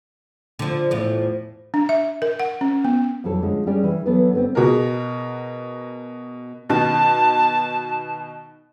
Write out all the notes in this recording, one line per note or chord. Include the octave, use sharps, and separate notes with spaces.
D3 F3
E2 A2 F3
D4
E5
A#4
F#5
C#4
B3
F2 B2 E3 F#3 A4
D3 F3 G#3 C#4
G3 C#4 D4 G#4 D5
E3
E3 F#3 B3 E4 A4 B4
D3 B3 C4
B2 F#4 G#4 A#4
B2 D#3 A5